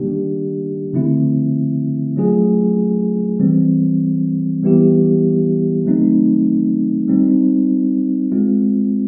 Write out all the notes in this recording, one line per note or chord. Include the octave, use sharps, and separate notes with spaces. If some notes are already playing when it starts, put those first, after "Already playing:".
Already playing: D#3 G3 A#3 D4 G4
D3 F3 A3 C4 E4
F#3 A3 C#4 F4 G#4
E3 G3 C4
E3 G3 B3 E4 G4
D#3 F#3 A3 C4 D#4
G3 C4 D#4
G#3 C4 F4